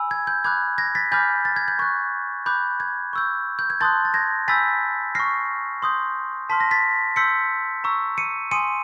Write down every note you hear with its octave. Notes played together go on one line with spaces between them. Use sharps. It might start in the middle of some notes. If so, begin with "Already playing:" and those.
Already playing: G#5 B5 E6
G#6
G6
B5 D6 F#6 G#6
G#6 A#6
A6 B6
G#5 B5 D6 F6 G6 A6
A6
G#6
G6
C#6 F#6 G#6
B5 D6 F#6 G6
G#6
C#6 E6 G6
G6
G#6
A5 C6 D#6 F#6 G6 A6
A6
G#6 A#6
G#5 B5 E6 G6 A6 B6
C#6 F6 A#6 C7
C6 D#6 G6
A5 C6 F6 B6
A#6
A6 B6
C6 E6 G6 B6 C#7
A#5 C#6 E6
C#7 D#7
G#5 C6 D#6 C#7 D#7